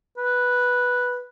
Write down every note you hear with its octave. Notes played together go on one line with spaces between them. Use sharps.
B4